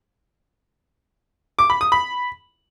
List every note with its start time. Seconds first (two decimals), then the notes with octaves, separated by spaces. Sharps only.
1.59 D6
1.70 B5
1.81 D#6
1.92 B5